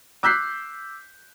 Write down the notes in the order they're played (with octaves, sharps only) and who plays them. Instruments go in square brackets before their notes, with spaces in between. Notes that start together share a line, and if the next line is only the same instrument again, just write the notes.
[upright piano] D6 E6 F#6 G6 B6 C7